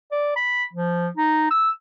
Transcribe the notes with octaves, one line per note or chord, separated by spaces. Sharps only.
D5
B5
F3
D#4
E6